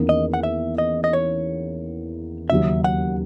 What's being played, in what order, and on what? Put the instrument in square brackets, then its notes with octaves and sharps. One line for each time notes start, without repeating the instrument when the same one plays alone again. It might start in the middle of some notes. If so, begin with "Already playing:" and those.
Already playing: [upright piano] E2 D#3 A#3 C#4 E4
[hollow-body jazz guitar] D#5
F#5
E5
D#5
D#5
C#5
[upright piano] D#2 C#3 F#3 C#4 [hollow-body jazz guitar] E5
[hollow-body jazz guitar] F#5